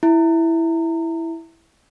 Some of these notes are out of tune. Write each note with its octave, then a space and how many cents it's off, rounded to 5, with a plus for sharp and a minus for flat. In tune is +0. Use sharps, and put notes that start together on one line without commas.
E4 +0